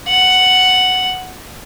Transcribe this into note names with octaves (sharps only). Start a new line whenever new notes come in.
F#5